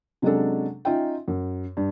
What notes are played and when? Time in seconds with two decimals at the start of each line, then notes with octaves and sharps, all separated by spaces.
0.22 C3 F#3 G#3 C#4 D4 A4
0.85 C#4 D#4 F4 E5 G5
1.28 F#2
1.77 G2